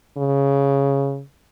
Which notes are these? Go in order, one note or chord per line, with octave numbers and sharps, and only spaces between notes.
C#3